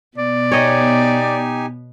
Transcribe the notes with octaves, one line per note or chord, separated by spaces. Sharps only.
B2 B3 D5
D#4 G4 C#5 D#5 G#5